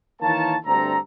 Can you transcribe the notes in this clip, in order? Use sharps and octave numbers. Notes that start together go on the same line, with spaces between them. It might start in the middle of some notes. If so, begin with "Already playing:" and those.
D#3 E3 A#3 C#5 A5
D2 G2 C4 A4 A#5